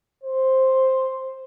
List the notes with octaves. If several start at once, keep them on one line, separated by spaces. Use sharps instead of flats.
C5